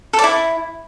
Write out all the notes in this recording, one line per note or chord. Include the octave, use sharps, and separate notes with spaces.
A4
D5
E4